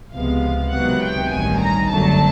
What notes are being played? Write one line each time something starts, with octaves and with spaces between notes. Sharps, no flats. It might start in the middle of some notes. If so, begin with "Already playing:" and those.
C#2 C3 F3 G#3 B3 F5
C#2 C3 D#3 F#3 B3 F#5
G5
A1 G2 D#3 G#5
A#5
G1 F#2 D3 F#3 A3 A5